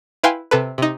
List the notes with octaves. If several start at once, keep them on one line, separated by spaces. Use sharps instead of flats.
E4 B4 F5 G5 G#5 C6
C3 A4 B4
C3 D#4